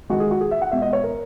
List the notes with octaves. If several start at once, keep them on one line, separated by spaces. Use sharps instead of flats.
D#3 G#3 F#4
G#4
F#4
G#4
E5
F#5
B2 G#3 E5
D#5
C#5
A#4